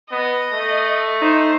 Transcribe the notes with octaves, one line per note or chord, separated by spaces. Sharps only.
B3 D#5
A3
D#4 C5